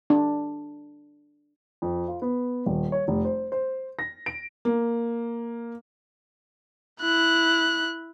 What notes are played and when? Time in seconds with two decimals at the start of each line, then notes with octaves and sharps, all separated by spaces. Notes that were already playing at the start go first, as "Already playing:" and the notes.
0.10 D4
1.82 F2
2.08 F4
2.22 B3
2.66 D#1
2.92 C#5
3.08 F1
3.25 C5
3.52 C5
3.99 A#6
4.26 D7
4.65 A#3
7.01 E4 F#6